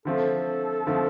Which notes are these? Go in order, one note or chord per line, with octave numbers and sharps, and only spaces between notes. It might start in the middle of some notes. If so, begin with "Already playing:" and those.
D3 F3 A3 C4 A4
D3 F3 A3 C4